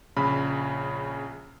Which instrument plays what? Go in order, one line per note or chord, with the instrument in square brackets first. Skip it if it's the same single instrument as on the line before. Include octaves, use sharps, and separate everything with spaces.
[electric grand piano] A#1 C#3 B5